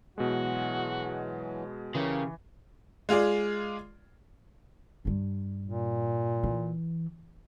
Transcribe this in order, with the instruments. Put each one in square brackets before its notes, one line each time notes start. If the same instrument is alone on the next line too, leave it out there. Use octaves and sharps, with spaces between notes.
[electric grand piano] B2 G#3 [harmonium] E3 F#3 [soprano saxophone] F#4
[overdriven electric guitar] C#3 [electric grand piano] E3 [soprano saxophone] G4 [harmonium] A#4
[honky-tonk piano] G#3 F4 G#4 D5
[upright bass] G2 G3
[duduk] A#2
[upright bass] E3